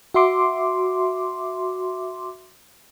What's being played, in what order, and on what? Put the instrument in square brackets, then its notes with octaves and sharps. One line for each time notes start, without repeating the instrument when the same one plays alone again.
[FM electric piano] F#4 E5 C6 D6